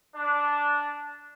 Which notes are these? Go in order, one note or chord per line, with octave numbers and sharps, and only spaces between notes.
D4